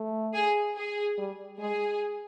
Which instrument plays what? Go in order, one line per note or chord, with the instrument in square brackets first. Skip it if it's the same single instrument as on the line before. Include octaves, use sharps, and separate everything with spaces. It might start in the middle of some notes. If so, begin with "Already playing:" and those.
Already playing: [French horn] A3
[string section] G#4
G#4
[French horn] G3
[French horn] G#3 [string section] G#4